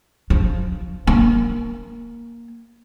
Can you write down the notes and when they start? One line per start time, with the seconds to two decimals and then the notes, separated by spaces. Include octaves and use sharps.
0.30 F3
1.07 A#3